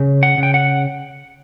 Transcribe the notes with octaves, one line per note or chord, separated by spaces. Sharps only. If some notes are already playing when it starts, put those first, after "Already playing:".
Already playing: C#3
F#5
C#3
G5
F#5